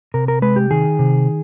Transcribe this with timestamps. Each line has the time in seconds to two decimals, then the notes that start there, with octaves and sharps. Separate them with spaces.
0.14 C3 A#4
0.28 A#4
0.42 G#3 B4
0.56 G4
0.71 D#3 G#4
0.99 C3